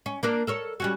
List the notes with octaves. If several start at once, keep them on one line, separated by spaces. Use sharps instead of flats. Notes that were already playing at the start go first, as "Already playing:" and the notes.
C#4
A#3 D4 A#4
A4 A#4 C#5
G3 C#4 F#4